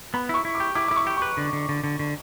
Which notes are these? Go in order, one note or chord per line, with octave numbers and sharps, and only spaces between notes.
B3 B5
E4 C#6
E4
D6
G4
E4 D6
E4 D6
C#6
G4
B4 C#6
D3
D3
D3
D3
D3